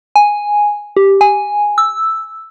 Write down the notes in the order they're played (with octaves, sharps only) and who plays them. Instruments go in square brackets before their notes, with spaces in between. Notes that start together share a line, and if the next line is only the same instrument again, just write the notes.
[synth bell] G#5
G4
G#5
E6